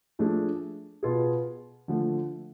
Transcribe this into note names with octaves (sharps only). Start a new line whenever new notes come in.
F3 A3 D4 G#4
B2 B3 F4 G#4
D3 F3 A3